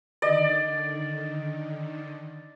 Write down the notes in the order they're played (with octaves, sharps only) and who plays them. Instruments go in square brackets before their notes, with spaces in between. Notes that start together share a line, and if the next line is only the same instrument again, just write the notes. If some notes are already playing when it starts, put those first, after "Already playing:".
[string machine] D3 D#3 [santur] D5 D#5